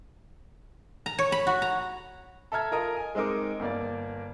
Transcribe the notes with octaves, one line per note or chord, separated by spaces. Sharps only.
A#5
C#5
B5
F#4
A#5
A4 E5 A#5 F6 G#6
F4 A4 A#4 D#5 A#5 D#6
G#5
G#3 C4 D#4 A#4 D6
G1 A#3 D5